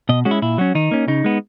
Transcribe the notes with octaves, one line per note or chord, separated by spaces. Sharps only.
B2 D#5
G#3 C#4 F#4
E4
A#2 E4
F#3 C#4 F#4
D#3 D#4
A#3 C#4
C#3 D#4
G#3 B3